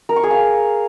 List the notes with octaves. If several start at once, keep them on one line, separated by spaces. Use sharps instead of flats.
A#4
C#6
G#4
F5